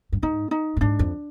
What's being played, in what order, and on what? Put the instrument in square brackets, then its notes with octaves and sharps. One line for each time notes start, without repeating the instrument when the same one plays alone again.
[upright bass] G2
[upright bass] G#2 [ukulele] D#4
[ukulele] D#4
[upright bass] A2
[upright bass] G#2 [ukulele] D4
[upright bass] F2